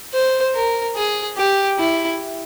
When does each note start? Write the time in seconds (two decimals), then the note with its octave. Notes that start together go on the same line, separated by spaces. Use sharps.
0.14 C5
0.55 A#4
0.95 G#4
1.37 G4
1.79 E4